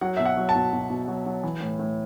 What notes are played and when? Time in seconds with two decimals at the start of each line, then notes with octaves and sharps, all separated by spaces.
0.01 F#3 F#5
0.17 B2 E5
0.25 F#5
0.37 F#3
0.49 A5
0.55 B2
0.73 B2
0.90 B2
1.08 F#3
1.26 F#3
1.43 E3
1.60 A2
1.79 A2